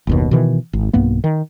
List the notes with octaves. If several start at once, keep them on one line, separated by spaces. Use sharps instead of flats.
F#1 D#2 B2
B2 D#3 E3
G#1
B1 G2 A#3 B3
D#3